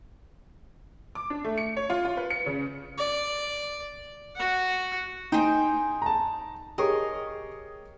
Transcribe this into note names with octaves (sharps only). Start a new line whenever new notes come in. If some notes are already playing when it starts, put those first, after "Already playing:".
D6
D4
A3
C#7
C#5
F4
F4
B4
C#7
C#3
D5
F#4 F#5
D#4 G#4 C5 G5
A5 A#5
G4 G#4 A#4 C#5 D#5